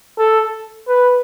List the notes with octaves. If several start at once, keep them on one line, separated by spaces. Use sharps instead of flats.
A4
B4